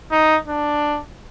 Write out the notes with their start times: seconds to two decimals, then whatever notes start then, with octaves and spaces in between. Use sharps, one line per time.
0.11 D#4
0.48 D4